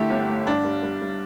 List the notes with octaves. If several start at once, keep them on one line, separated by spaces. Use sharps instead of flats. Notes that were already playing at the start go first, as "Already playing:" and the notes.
Already playing: D3 A3 E4 G4
G1
A3
G2 D4
G3
G3
G3